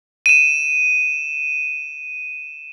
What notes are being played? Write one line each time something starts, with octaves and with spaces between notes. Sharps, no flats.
D#7 E7